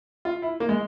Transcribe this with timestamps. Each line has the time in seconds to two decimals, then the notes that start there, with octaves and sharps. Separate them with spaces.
0.25 F4
0.42 E4
0.60 A#3
0.69 G#3